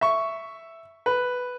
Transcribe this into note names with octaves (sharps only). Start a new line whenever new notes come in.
E5 C#6
B4